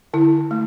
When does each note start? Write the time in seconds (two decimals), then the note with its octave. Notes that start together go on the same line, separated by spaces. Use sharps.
0.14 D3 E4
0.51 A3